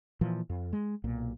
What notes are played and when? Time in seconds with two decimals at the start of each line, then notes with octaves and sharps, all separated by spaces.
0.21 A#2 E3 F3
0.50 F2
0.73 G#3
1.04 B1 A#2